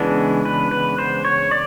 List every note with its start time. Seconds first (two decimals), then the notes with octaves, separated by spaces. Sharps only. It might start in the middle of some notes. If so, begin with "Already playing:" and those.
Already playing: C#3 E3 G#3 B3 D4
0.45 B4
0.71 B4
0.98 C5
1.25 C#5
1.51 D5